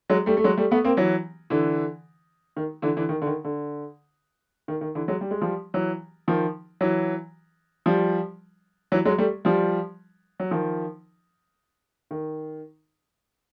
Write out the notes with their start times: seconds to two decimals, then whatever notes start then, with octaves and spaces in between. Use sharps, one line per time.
0.10 F#3 G#3
0.26 G3 A3
0.37 A3
0.44 F#3 G#3
0.58 G3 A3
0.71 A3 B3
0.84 A#3 C4
0.97 E3 F#3
1.50 D3 E3
2.56 D#3
2.82 D3 E3
2.96 D3 E3
3.09 D#3
3.22 D3
3.27 D#3
3.44 D3
4.68 D#3
4.81 D#3
4.95 D3 E3
5.08 F#3 G#3
5.21 G3
5.31 G#3
5.41 F3 G3
5.74 E3 F#3
6.28 D#3 F3
6.81 E3 F#3
7.86 F3 G3
8.92 E3 F#3
9.05 F#3 G#3
9.18 G3 A3
9.45 F3 G3
10.40 F#3
10.51 D#3 F3
12.11 D#3